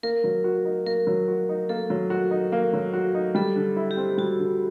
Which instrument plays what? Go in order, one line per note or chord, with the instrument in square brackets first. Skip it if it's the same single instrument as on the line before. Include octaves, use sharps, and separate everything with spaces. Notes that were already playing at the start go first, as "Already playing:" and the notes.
[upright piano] A#3 [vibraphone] A#4
[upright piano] F#3
F#4
D#4
[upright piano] A#3 [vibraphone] A#4
[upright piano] F#3
F#4
D#4
[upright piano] A#3 [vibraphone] A4
[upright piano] F#3
F#4
D#4
A#3
F#3
F#4
D#4
[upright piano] G3 [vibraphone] A4
[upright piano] D3
E4
[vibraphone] G4
[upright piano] C4
[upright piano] G3 [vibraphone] F#4
[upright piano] D3